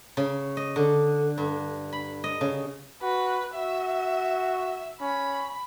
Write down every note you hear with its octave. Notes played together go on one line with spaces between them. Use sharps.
C#3
D#5
D3
G2
B5
D#5
C#3
F#4 B4
F#4 E5
C#4 B5